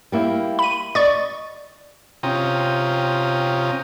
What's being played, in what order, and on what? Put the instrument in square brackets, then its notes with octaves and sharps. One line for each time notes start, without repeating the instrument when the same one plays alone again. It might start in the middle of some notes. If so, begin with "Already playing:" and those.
[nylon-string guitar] G3 A#3 E4
[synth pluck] B5 D#7
[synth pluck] D5 C#6 [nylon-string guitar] D#5
[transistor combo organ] C3 C#4 F4 G5 A#5 D#6